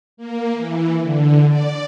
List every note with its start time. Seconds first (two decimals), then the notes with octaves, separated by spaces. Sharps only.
0.17 A#3
0.54 E3
1.02 D3
1.49 D5